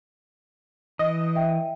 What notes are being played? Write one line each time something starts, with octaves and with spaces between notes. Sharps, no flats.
E3 D#5
E5 G5